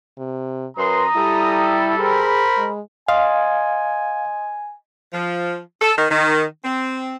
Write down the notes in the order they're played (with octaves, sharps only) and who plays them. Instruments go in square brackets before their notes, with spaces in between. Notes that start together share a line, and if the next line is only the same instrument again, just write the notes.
[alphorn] C3
[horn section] F#2 C6 [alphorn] B4 [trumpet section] A#5 D#6
[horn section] G3 A4 [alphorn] E4
[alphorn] G#4 [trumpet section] A#4 C5 B5
[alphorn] G#3
[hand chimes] D#5 C6 D#6 [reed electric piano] F5 [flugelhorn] G#5
[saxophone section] F3
A4
D#3
D#3
C4